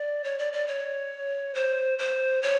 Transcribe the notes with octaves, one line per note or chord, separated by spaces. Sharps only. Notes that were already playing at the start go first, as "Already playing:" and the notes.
Already playing: D5
C#5
D5
D5
C#5
C5
C5
C#5